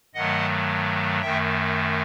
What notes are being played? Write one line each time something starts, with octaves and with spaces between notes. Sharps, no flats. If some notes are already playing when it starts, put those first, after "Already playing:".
G2 D#3 F#3 A3 D#5 F#5
F#2 D#3 A3 E5 G5